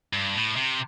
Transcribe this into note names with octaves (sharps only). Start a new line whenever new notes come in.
G2
A2
C3